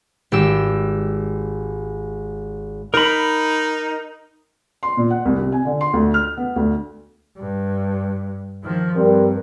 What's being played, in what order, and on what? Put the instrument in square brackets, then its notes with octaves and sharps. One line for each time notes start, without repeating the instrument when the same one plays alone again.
[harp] G#1 G4 E6
[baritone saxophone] D#4 [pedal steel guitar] A#4 B5
[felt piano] C6
A#2
F#5
C2
C3
G#5
D3
C6
D2
F6
B3
D2
[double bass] G2
D#3 F3
[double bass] G2 [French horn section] G3 C4 A#4